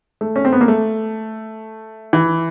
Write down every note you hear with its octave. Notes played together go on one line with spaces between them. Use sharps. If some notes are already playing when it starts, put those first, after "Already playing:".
A3
C#4
C4
B3
A#3
A3
E3